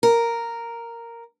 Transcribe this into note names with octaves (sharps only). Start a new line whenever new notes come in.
A#4